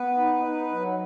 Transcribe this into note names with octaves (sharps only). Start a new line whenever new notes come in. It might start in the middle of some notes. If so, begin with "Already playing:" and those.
Already playing: B3 B4
D#4
D#4
F#3